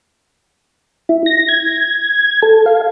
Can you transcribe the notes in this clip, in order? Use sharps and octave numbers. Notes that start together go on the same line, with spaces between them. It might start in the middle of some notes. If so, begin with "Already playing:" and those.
E4
A#6
G#6
A4
F5